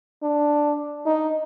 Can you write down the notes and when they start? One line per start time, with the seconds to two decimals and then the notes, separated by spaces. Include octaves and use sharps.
0.23 D4
1.06 D#4